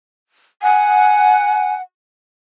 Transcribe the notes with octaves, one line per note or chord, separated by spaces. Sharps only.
F#5 G#5